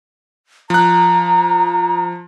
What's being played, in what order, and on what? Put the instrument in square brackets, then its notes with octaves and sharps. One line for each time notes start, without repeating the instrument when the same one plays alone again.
[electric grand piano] F3 F#6 [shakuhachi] A#5